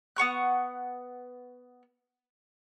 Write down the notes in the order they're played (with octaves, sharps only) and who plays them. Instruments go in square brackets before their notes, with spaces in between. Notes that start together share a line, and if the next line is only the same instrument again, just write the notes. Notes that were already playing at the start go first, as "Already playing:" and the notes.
[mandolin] B3 F#5 C#6 F#6